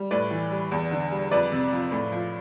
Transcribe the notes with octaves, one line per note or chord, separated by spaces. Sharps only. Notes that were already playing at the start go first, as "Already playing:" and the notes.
Already playing: G3
A2 B4 D5
E3
G3
E2
D3
G3
F2 B4 D5
C3
F3
A2
F3